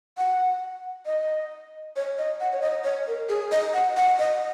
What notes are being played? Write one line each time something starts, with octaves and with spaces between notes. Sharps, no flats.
F#5
D#5
C#5
D#5
F#5
C#5
D#5
C#5
A#4
G#4
D#5
F#5
F#5
D#5